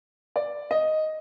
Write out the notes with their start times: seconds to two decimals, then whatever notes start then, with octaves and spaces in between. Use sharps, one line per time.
0.36 D5
0.71 D#5